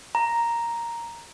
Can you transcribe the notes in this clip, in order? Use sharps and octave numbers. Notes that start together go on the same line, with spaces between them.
A#5